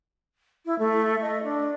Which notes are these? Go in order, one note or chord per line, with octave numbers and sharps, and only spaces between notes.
E4
A3
D#5
D4